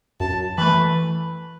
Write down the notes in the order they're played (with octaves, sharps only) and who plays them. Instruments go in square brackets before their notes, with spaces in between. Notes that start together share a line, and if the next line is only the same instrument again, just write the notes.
[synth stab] F#2 [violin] A5
[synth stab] E3 A3 [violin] B4